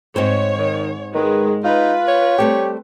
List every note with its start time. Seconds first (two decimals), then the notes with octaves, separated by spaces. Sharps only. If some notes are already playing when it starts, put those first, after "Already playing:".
0.16 G#2 C4 C5 C#5
0.58 D#3
1.14 D#3 G#3 B4
1.64 D#4 F4 B4
2.08 C#5
2.38 G3 A3 C4 G4